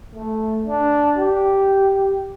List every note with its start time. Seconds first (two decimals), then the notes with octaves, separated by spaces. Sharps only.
0.15 A3
0.66 D4
1.18 G4